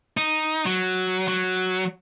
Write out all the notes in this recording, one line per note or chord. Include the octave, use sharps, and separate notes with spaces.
D#4
F#3
F#3